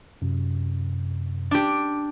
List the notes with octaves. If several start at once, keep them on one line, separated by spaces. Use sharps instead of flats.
F#2 C3
D4 G4